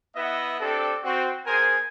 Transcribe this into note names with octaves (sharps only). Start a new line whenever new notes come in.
B3 E4 B4 D#5 E5 F#5
C4 D4 G4 A4
C4 F#4
B3 G#4 A#4 C5 G#5